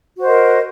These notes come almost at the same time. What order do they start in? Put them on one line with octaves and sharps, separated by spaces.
F#4 C5 D#5 A#4